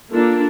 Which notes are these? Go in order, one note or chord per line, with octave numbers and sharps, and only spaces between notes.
A#3 D4 F4 A4